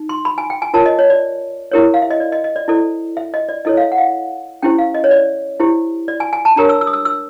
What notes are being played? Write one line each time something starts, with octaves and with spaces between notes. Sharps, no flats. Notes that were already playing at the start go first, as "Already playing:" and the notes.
Already playing: D#4
C6
B5
G#5
G5
G#5
F4 A#4 C#5 A5
D#5
C#5
D5
E4 G4 A#4 C#5
F5
E5
D#5
D5
D#5
D#5
D5
E4 A4 C5 D5
E5
D#5
D5
E4 A4 C#5 D#5
F5
E5
F#5
F5
C#4 E4 G4 C5 G5
F5
D#5
C#5
D5
E4 G4 C5
D5
G#5
G#5
A5
D4 G4 A#4 C#5 A#5
E6
E6
D#6
E6
E6